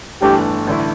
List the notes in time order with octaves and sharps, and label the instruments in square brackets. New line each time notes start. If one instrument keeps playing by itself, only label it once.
[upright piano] G1 G2 E3 A3 [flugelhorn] G4
[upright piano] A1 G2 D3 A3 E4